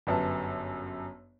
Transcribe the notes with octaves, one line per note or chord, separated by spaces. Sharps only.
G1 F#2 A5